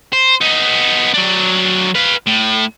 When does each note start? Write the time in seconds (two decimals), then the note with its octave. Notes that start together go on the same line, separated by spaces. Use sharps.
0.13 C5
0.41 B3 D#4
1.14 F#3 D4
1.95 B4 F5
2.27 A2